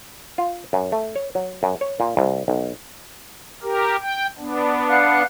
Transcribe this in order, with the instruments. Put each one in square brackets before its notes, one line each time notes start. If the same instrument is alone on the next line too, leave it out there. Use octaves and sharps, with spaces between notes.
[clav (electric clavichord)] F4
F#2
A3
C#5
F#3
F#2
C#5
A#2
C2
B1
[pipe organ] G4 A#4
G5
B3 D4
[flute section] F5 F#5 F#6